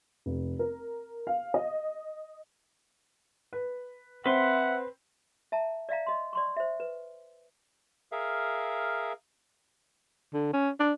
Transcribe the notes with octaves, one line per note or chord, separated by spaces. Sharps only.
F1
A#4
F5
D#5
B4
C4 B4 E5 F#5 C6
E5 A5 A#5
D5 E5 F5 A#5
D#5 C6
D5 C6 C#6
C5 E5
B4
G#4 A#4 E5 F5
D3
C#4
D4